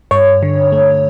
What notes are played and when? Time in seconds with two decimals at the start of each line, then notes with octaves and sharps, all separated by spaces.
0.11 G2 C#5
0.43 D3
0.72 A3